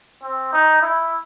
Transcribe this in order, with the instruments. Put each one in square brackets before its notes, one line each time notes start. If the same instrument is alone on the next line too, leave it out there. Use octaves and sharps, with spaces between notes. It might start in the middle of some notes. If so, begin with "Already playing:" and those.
[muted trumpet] C4
D#4
E4